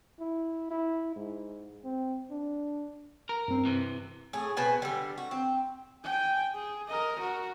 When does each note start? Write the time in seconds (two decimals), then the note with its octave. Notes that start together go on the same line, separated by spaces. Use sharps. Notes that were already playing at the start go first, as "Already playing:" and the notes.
0.20 E4
0.71 E4
1.16 G#2
1.84 C4
2.30 D4
3.29 A#4
3.48 G2 C4
3.65 C3 E3
4.33 A2 G#4
4.57 B2 B4 C5 G#5
4.82 D3 G3
5.18 F#4
5.31 C4
6.04 G5 G#5
6.54 G#4
6.88 A#4 D#5
7.19 F#4 A#4